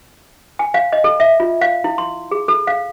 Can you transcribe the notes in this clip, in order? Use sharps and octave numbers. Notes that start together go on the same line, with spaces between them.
G#5
F5
D#5
A4
E5
F4
F5
E4
C6
G#4
A4
F5